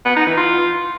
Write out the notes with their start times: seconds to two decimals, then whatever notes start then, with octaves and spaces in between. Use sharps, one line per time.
0.05 B3
0.16 D#4
0.27 E3
0.37 F4